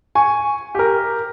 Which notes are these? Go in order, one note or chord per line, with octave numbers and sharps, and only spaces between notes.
G#5 C#6
G4 A#4